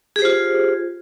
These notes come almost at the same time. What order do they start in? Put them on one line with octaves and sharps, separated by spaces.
G#4 G4 C5 F4